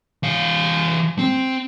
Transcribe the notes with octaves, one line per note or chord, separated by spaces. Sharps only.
E3 F5
C4